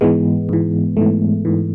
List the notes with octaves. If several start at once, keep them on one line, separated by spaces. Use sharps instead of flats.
G#2 E3 G#3 B3
G#2 E3
G#2 E3 A3
G#2 E3